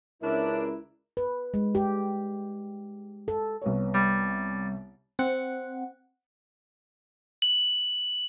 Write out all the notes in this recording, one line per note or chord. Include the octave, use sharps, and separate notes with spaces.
C#2 C#4 D4 E4 A#4 E5
B4
G#3
G4
A4
C2 B3 C#5
G3
C4 F#5
F#7